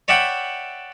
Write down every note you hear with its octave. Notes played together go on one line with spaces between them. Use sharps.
C#5 D5 E5 F#5 G5 B5